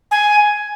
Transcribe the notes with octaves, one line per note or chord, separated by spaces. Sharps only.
G#5